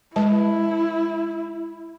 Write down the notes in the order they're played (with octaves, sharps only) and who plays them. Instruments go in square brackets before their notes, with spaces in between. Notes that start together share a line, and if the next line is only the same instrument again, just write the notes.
[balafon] G#3 B4 A5 [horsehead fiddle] E4